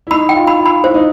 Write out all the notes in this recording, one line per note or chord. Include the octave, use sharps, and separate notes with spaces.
E4
D#4 B5
G5
F4
B5
F4
B5
E4 C5
D#4